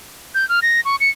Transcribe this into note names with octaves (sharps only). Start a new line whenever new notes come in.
G6
F6
A#6
C#6
C#7